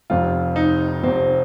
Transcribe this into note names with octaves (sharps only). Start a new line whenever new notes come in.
F1 F2 C3 F4
D#4
F1 F2 C3 C4